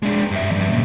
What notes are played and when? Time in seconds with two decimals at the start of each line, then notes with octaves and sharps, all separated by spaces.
0.03 G#3 D4
0.31 G2 E5
0.51 E2 G2
0.70 A#2 C#3